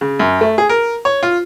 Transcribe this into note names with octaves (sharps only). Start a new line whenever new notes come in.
C#3
F#2
A3
G#4
A#4
C#5
F4